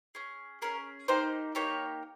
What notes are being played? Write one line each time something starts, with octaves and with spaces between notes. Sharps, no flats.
C#4 G#4
C#4 G#4 A#4
A#3 D#4 G4 C5
A#3 D#4 G4 C#5